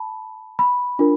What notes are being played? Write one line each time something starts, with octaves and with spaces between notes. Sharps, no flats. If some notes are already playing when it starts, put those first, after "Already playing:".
Already playing: A5 B5
B5
D4 F4 A#4